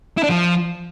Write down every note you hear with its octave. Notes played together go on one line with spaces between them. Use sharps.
E4
D4
F3